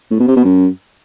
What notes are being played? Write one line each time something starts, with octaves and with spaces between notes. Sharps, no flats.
A2
B2
C3
B2
F#2